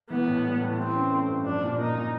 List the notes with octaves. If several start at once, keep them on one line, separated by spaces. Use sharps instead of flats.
E3 B3
A2
G3
A2
E3 C4
C#4
A3
G2
F3 D4
A#2
A#3 D#4
A#2